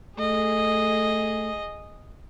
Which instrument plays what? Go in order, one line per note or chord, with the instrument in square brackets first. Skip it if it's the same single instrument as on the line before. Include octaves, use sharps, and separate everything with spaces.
[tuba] A3 [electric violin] G#4 D#5